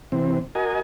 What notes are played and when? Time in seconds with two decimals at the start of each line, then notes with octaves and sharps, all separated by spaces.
0.12 C3 E3 C4
0.55 F#4 A#4 D#5 G#5